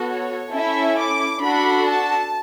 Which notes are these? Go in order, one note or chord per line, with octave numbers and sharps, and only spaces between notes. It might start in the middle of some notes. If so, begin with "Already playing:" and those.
Already playing: B3 F#4 A4
C#5
C#4 E4 A4 E5
D6
D4 F#4 A4 B5
A5